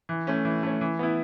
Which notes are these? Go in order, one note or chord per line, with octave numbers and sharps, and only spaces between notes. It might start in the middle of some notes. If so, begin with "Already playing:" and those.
E3
A3 C#4
E3
A3 C#4
E3
B3 E4